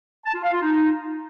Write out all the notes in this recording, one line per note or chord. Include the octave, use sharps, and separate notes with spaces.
A5
F4
F5
F4
D#4